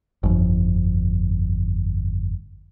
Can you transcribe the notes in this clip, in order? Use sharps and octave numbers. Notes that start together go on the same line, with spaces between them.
G1 F2